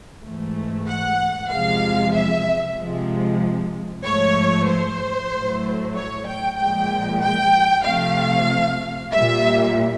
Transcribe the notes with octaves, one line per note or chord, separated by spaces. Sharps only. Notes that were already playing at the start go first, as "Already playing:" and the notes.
G#2 E3 A3
F#5
E2 C3 F3 G#3 F5
E5
C3 F3 G#3
G#2 F3 A3 C#5
C5
A2 F#3 A3
C#5
G5
A#2 F3 G#3 G5
G5
C3 F3 A3 F5
A#2 G3 E5